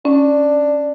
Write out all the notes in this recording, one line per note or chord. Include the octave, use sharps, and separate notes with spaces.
C#4 D4